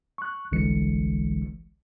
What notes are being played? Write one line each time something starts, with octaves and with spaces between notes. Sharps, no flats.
C#6 F#6
G1 C2 D3 E3 G#3 C#7